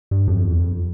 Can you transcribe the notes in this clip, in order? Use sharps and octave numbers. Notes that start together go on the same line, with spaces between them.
G2
F2
E2
F2